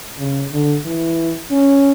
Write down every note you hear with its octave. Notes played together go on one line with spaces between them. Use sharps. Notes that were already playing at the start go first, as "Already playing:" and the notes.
C#3
D3
E3
C#4